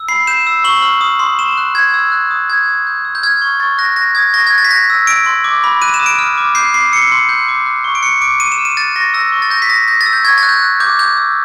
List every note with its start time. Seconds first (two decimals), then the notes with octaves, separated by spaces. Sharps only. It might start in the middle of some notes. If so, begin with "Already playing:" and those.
Already playing: E6
0.09 B5 C7
0.27 G6 E7
0.47 E6
0.64 C#6 F#7
0.82 F6
1.01 D#6
1.19 C6
1.38 C#6 E7
1.57 F#6
1.75 G6 G#6
1.94 E6
2.12 F#6
2.31 D#6
2.49 G6 G#6
2.68 D#6
2.87 G6
3.05 E6
3.15 G6
3.23 F6 G#6
3.42 C#6
3.60 C#6 A6
3.78 F#6 A#6
3.96 G6 A#6
4.15 D#6 G#6
4.34 C#6 A#6
4.47 G#6
4.53 F#6
4.58 A6
4.65 B6
4.71 G6 A#6
4.90 E6
5.07 E6 D7
5.26 C6
5.44 D6
5.64 B5
5.82 F#6 D#7
5.94 E7
6.00 D#6
6.06 D7
6.19 F6
6.38 D6
6.55 G6 C7
6.74 D6 C7
6.92 E6 C#7
7.11 C6
7.29 G6
7.48 D6
7.66 F#6
7.84 C#6
7.95 D7
8.03 F#6 C#7
8.21 D6 D7
8.40 C#6 D#7
8.52 E7
8.59 F6
8.65 D#7
8.77 F#6 A6
8.96 C#6 A#6
9.14 E6 A#6
9.32 C#6
9.42 A6
9.50 G6 A#6
9.62 B6
9.69 D#6 A#6
9.88 G6 A#6
10.01 A6
10.06 E6
10.13 G6
10.24 C#6 G#6
10.38 A6
10.43 F#6
10.49 G6
10.62 F#6
10.80 D6 G6
10.99 G6
11.17 E6